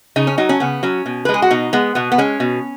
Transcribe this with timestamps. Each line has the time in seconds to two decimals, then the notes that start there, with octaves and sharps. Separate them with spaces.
0.16 C#3 D#4
0.27 C#4
0.38 F#3 D#4
0.49 C#4
0.60 C#3 B3
0.83 F#3 C#4
1.06 B2
1.25 B4
1.29 G#3
1.34 G#4
1.42 F#4
1.50 B2 D#4
1.73 G#3 B3
1.95 B2 B3
2.12 B3
2.18 G#3 C#4
2.40 B2